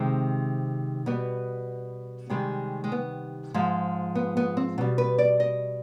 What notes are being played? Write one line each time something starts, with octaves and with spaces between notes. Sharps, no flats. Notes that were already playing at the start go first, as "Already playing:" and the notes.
Already playing: C3 D#3 G#3 C4
B2 G3 B3
C3 D#3 G3 G#3
G#3
B3
G#2 F3 G#3
B3
B3
C4
B2 G3
B4
D5
D#5